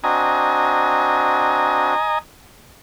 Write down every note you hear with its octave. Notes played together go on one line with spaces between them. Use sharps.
C4 D4 F#4 D#5 G#5 A#5